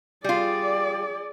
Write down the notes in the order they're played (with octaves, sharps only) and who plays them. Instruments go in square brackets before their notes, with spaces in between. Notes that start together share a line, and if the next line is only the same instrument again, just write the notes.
[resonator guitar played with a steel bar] G3 F4 [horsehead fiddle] G#4 D5